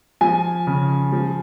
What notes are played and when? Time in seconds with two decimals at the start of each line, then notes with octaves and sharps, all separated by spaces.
0.21 F3 G#5
0.67 C#3
1.12 F3